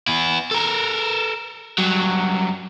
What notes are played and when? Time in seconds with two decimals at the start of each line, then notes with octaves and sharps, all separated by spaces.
0.08 B3 E4
0.51 A4 A#4
1.79 G2 F#3